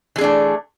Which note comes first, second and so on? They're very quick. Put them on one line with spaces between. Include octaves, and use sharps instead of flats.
E3 G#4 D4 A3